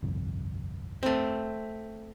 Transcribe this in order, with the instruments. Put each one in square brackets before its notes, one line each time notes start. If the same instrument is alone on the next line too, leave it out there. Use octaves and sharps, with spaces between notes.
[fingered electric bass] G1 C2 F2
[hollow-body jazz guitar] A3 C4